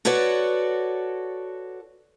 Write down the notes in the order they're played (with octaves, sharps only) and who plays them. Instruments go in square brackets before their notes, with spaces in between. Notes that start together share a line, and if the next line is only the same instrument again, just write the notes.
[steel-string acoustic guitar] F#4 A4 B4 C#5 D5